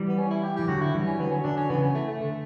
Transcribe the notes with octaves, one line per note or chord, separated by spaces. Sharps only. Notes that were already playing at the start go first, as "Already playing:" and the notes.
Already playing: E3 G3
B3
C#4
E4
G4
E3 G4
D3 F#3 F#4
E4
E3 G3
C#4
D3 F#3 B3
C#4
D3 F#3 D4
C#4
C#3 E3 B3
C#4
A3
A3
D3